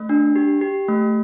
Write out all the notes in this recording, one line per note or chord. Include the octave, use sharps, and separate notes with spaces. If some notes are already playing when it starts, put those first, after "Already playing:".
Already playing: A3
D4
G4
G4
A3